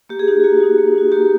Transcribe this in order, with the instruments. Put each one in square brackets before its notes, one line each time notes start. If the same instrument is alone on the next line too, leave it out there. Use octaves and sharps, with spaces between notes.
[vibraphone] A#3 G4
G#4
D#4 F#4 G4
A#3 F#4
D#4 F#4
A#3
D#4 F#4
A#3 G4